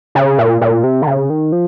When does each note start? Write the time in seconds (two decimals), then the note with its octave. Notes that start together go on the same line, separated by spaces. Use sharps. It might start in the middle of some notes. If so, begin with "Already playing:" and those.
0.15 C#3
0.38 A#2
0.61 A#2
0.84 C3
1.02 D#3
1.07 C#3
1.30 D#3
1.52 F3